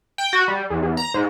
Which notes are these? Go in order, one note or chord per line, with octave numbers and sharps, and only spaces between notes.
G5
F#4
G3
E2
E2
A#5
G#2